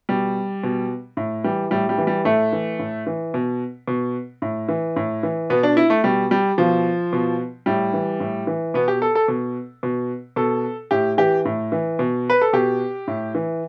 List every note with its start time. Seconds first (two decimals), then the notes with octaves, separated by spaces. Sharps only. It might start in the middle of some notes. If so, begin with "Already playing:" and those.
0.09 B2 G3
0.63 B2
1.17 A2
1.44 E3 G3
1.71 A2 G3
1.89 G3
1.98 E3
2.07 G3
2.25 A2 A3
2.53 E3
2.79 A2
3.07 E3
3.34 B2
3.88 B2
4.42 A2
4.69 E3
4.96 A2
5.23 E3
5.50 B2 B3
5.63 D4
5.77 E4
5.90 A3
6.04 B2 G3
6.31 G3
6.58 B2 F3
7.13 B2
7.66 A2 G3
7.93 E3
8.20 A2
8.47 E3
8.74 B2 B3
8.88 G4
9.02 A4
9.15 A4
9.28 B2
9.83 B2
10.36 B2 A4
10.91 A2 G4
11.18 E3 G4
11.45 A2
11.72 E3
11.99 B2
12.30 B4
12.41 A4
12.53 B2 G4
13.08 A2
13.35 E3